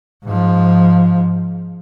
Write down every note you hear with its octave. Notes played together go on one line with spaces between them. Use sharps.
G#2 F3